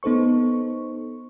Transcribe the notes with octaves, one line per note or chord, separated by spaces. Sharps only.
B3 D#4 A4 C5 C#6